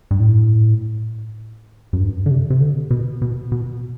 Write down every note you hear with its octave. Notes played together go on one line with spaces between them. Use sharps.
G2
A2
F#2
G2
D3
C3
C3
D3
B2
B2
B2